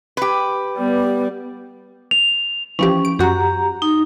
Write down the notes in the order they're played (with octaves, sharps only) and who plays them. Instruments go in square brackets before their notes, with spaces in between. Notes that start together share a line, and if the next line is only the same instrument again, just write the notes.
[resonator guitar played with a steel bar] G4 B4
[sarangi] G3 [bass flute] B3
[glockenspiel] F7
[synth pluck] E3 F3 G4 [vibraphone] C#4
[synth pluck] D7
[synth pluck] F#2 F#4 [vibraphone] G4 A#5
[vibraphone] D#4